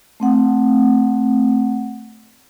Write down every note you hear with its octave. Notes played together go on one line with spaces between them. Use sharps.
A3 C4 F#5